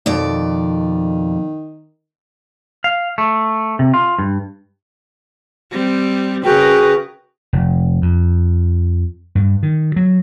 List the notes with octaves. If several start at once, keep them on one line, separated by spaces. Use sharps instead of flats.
F2 B2 D#3 D5
F5
A3
C3
F4
G2
G3 C4
C#3 F#4 G#4 A#4 B4 G5
F1
F2
G2
D#3
F#3